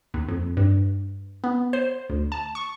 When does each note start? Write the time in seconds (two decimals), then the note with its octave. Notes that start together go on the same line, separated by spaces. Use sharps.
0.14 D#2
0.29 F2
0.57 G2
1.44 B3
1.73 C5
2.10 D2
2.32 A5
2.55 C#6